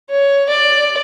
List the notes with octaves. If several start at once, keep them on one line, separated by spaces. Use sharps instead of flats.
C#5
D5